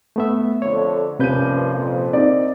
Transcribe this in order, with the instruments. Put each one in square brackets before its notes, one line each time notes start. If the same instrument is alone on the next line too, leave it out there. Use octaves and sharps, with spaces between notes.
[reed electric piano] A3 B3 E5
[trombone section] F2 D3 A3 [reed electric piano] C#5
[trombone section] G2 F3 A#3 [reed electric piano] C3 B4 G6 [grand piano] C#4 D#7
[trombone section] F2 A#2 F3
[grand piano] C4 D#4 D5